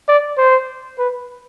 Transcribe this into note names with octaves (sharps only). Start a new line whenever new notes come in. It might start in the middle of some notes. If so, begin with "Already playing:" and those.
D5
C5
B4